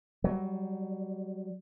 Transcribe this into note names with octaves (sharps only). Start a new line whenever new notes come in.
F#3 G3